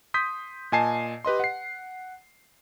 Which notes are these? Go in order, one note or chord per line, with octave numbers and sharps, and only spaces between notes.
C6 D#6 G6 B6
A#2 D#5 G#5 A5 C7
G4 B4 D#5 C6
F#5 C7